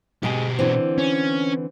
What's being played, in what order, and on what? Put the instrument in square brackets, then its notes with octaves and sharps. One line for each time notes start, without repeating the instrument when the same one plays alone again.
[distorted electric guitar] B2 G4 [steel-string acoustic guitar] G#3 G#4
[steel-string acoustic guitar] D3 E3 C4
[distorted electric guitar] C#4